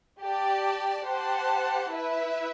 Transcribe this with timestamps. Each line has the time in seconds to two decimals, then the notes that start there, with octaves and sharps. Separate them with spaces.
0.22 G4 D5 A5
1.06 G4 C5 F#5 A5
1.91 E4 B4 E5